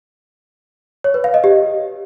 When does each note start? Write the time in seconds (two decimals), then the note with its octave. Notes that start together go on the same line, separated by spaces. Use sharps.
1.04 C#5
1.14 B4
1.24 F5
1.34 D#5
1.44 G4